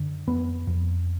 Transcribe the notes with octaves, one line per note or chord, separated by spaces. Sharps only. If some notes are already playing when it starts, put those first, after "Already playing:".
Already playing: F#2 D3
F2 B3
F2